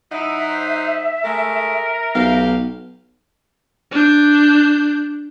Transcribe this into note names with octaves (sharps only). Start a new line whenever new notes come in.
F#3 D#4 E4 E5
C5
G#3 A3 A#4
B1 G4 F5
D4 G6